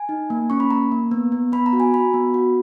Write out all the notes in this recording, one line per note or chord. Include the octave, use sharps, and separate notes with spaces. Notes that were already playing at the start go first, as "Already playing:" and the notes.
Already playing: G#5
D#4
A#3
C#4 C#6
B5
A#3 A#5
A#3
B3
B3
B3 B5
A#5
F#4
G#5
F#4 B5
B3
F#4